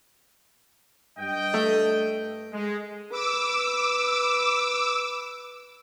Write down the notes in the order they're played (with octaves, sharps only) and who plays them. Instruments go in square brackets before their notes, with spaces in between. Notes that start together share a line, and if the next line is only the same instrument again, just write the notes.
[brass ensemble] G2 D#5 G5
[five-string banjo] A3
[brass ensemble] G#3
[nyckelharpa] B4 [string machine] D6 E6